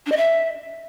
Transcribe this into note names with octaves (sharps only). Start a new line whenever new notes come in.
D4
D#5
E5